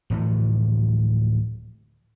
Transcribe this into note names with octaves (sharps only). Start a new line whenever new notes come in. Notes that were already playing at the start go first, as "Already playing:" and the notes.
D1 A2 E3 F3